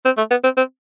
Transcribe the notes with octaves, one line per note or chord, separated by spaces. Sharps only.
C4
A3
B3
C4
C4